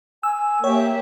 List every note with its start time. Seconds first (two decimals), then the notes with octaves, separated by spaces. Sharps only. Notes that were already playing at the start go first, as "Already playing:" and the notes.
0.23 G#5 E6
0.64 A#3 G4 C#5 E5 G5